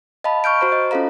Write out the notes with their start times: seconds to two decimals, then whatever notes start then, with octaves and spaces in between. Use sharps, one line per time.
0.24 D#5 F5 A5 B5
0.44 C#6 F6 G6 D7
0.61 F#4 C5 A#5
0.72 D#5
0.91 C#4 F4 A4 F5 A#5